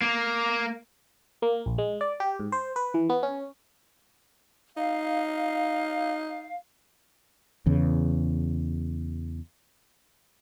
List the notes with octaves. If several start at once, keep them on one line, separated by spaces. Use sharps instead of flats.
A#3
A#3
A#1
G#3
D5
G4
G#2
C5
B4
E3
B3
C#4
D#4 F5
E2 C#3